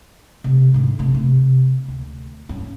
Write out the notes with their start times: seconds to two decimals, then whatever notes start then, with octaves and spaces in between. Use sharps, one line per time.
0.44 C3 A3
0.74 G#2 D3
0.99 C3 A3
1.14 C3
1.88 D2
2.49 G2 C#4